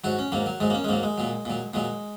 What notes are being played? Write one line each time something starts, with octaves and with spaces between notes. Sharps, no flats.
G#2 F#3 F#4
C#4
G#2 F#3 A#3
F#3
G#2 F#3 G#3
A#3
C#4
G#3
G#2 F#3 A#3
G#3
A#2 F#3
A#2 F#3
A#2 F#3 G#3